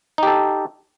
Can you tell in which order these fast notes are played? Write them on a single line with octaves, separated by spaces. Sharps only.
D#4 G4 A4